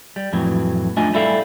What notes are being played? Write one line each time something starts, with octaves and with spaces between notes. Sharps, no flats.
G3
F2 A2 E3 F#3
A3 D4 F4 D#5 G#5
G3 E4 A4 F5